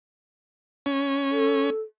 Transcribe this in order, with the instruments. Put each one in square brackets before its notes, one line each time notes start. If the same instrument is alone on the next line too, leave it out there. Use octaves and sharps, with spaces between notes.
[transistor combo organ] C#4
[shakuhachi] A4